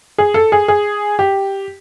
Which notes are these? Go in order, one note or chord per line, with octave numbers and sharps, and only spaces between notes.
G#4
A4
G#4
G#4
G4